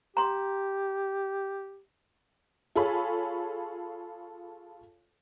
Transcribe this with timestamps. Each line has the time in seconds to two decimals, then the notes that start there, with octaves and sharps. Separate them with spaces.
0.17 G4 A#5 C6
2.76 F4 G#4 A4 C#5 G#5 B5